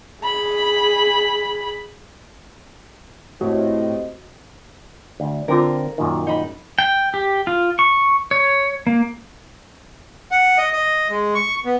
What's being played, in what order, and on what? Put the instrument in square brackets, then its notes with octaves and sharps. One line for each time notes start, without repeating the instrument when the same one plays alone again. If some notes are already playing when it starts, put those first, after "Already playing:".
[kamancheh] G#4 B5
[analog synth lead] A2 [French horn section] C4 G4 D#5 [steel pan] F#4
[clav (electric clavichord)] D2
[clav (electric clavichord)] D3 C4 [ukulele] F4 A#4
[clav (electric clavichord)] F#2 A#2 D#3
[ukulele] D#4 B5
[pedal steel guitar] G5
G4
F4
C#6
C#5
A#3
[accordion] F#5
D#5
D#5
G#3
C#6
B3